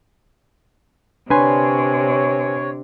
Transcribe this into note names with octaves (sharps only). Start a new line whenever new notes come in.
C3 D4 B4 C#5 G#5 C6